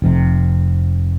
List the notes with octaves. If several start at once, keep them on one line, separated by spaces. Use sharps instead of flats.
F1 F2 C3